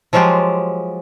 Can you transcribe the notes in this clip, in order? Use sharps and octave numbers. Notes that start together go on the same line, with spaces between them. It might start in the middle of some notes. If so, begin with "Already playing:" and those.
F3 F#3 G#3 F4 G4